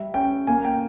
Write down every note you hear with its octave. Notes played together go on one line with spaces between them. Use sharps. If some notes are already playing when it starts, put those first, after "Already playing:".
Already playing: G3 E5
C#4 G5
A#3 G#5
G5